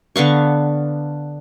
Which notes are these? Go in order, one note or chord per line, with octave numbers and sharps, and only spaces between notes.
D3 B3 F5 C#6